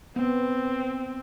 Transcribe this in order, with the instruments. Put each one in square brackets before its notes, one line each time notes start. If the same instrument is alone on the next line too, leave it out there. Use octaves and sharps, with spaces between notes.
[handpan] B3 [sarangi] C4